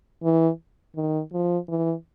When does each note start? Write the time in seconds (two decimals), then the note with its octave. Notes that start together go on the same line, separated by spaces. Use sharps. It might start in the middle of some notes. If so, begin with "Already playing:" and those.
0.24 E3
0.96 D#3
1.32 F3
1.69 E3